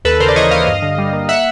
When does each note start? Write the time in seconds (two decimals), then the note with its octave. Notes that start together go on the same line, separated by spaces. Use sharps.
0.05 D#2 A4 B4
0.20 C#3 A#4 C5
0.28 D5
0.36 E3 C#5 D#5
0.51 D#2 D#5 F5
0.67 G2
0.82 D3
0.98 G3
1.13 A#3
1.29 E5 F#5